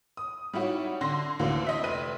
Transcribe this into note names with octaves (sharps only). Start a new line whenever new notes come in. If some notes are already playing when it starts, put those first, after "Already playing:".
D#6
G3 D#4 E4 F#4 C#5
D3 C6 A#6
D2 D3 E3 A#3
D#5 E5
F1 B4 D#7